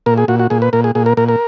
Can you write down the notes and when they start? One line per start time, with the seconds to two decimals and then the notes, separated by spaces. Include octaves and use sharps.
0.06 A#2 A#4
0.18 G#4
0.28 A#2 F#4
0.39 F#4
0.50 A#2 G#4
0.62 B4
0.73 A#2 A#4
0.84 G#4
0.95 A#2 G#4
1.06 A#4
1.17 A#2 A#4
1.29 A#4